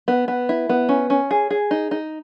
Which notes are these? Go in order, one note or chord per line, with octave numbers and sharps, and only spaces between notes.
B3
B3
E4
B3
C#4
C#4
G#4
G#4
D#4
D#4